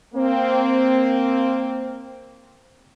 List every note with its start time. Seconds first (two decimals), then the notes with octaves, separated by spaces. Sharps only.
0.14 A#3 C4